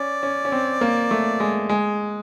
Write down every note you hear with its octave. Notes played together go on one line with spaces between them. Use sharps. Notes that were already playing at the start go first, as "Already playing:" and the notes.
Already playing: C#4 D5
C#4
C#4
C4
A#3
A3
G#3
G#3